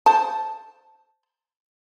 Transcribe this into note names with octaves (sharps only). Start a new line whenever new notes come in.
C5 A5